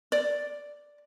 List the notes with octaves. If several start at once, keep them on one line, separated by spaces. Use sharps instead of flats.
D5